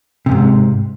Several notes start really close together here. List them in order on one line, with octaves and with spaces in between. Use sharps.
C3 F2 G#2